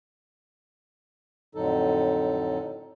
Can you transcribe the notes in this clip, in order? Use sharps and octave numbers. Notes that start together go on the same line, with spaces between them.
F2 A2 D3 F#3 D#4 A4